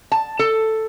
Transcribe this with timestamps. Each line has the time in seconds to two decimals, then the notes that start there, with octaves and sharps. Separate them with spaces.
0.12 A5
0.39 A4